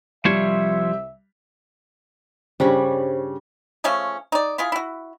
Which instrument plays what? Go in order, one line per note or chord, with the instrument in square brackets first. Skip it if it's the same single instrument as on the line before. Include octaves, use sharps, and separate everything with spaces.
[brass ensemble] C2 E5 [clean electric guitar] F3 C5 C#5 [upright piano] G3
[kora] G2 C#4 D4 [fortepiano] C#3 [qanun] G3 B5 C#6 [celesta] C5
[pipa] C#3 F3 A3 C#4
D#4 D5
E4 F4 G#4
E4 F#4